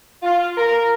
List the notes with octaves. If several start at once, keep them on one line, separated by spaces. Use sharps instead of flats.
F4
A#4